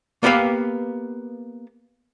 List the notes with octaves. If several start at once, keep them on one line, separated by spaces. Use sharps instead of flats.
A#3 B3 G4 B4 F5